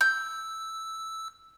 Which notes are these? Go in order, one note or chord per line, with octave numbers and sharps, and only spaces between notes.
E6 G6